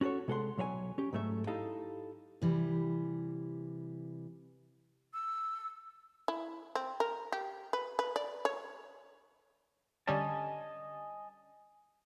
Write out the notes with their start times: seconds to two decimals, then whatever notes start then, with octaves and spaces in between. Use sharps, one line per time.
0.01 C#4 F#4 G#4 A4 C#5
0.28 C3 G#3 A4 C5 F#5 C6
0.57 B1 F#3 C#5 E5 G#5
0.98 C#4 G4
1.13 G#2 F#3 A3 A4 E5
1.47 D#4 E4 G4 A4 D#5 F5
2.42 C3 E3 G3
5.13 E6
6.28 E4
6.75 C4
7.00 A#4
7.32 G4
7.73 B4
7.99 B4
8.16 D5
8.45 C#5
10.07 D3 G3 C#4 D#5 G#5 A5